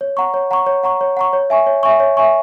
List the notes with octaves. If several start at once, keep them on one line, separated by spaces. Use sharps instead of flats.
C#5
F#5 A#5 C#6
C#5
F#5 A#5 C#6
C#5
F#5 A#5 C#6
C#5
F#5 A#5 C#6
C#5
E5 G#5 C#6
C#5
E5 G#5 C#6
C#5
E5 G#5 C#6